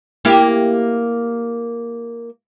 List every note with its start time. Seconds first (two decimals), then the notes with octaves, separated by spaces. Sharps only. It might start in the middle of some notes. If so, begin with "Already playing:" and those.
0.25 A#3 E4 G4